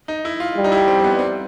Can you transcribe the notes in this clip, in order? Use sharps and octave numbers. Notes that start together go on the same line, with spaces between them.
D#4
E4
F4
G3
D#4
E4
C4
C4
B3
C4